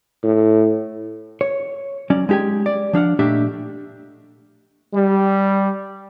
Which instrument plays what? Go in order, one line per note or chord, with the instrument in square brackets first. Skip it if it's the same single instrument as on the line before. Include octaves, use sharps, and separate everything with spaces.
[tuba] A2
[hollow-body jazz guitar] C#5
F#3 C#4 D5
G#3 D#4 G4 G5 G#5
D5
F3 D4 F5 F#5
A#2 A3 D4 D#4 G4 E5
[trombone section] G3